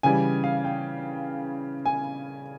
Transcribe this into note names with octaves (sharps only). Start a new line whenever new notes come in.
C#3 E3 G3 G#5
F5
G5
G#5